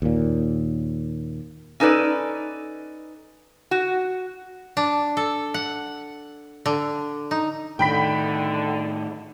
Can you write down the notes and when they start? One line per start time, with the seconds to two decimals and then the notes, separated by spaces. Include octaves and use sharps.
0.02 D#2 A#2
1.80 C#4 D#4 A4 B4 D5
3.71 F#4
4.77 D4
5.17 A4
5.54 F#5
6.66 D3
7.31 D#4
7.79 A2 D3 D#3 G5 B5 B6